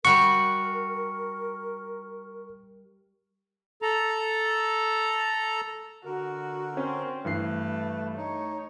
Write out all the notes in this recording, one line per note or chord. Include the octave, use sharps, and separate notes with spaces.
G3 F#4 A#4 C#6
A4 A#5
D3 F#4 A#4
C4 C#4
G2 E3 A3 B4 C7
D#4 C#5